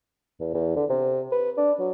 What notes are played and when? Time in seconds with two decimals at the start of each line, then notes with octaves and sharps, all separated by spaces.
0.40 E2
0.54 E2
0.76 D3
0.89 C3
1.32 B4
1.57 D4
1.80 F#3